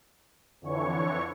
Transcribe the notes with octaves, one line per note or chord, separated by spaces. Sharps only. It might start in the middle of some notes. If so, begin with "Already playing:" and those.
F2 D3 E3 C#5 C#6